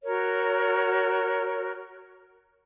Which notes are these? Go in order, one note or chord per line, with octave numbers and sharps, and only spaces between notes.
F#4 A#4 C#5